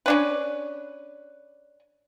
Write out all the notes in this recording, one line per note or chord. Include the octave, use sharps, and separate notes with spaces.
C#4 D4 B4